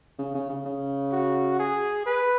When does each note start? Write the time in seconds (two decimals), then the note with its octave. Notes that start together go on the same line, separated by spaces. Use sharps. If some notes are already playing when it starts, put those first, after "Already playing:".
0.19 C#3
0.35 C#3
0.50 C#3
0.66 C#3
1.12 F#4
1.59 G#4
2.06 B4